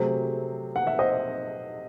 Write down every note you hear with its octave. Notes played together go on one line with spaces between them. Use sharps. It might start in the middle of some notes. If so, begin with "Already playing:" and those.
Already playing: C3 F#3 A3 C4 G#4 C5
F#5
E5
C5 D#5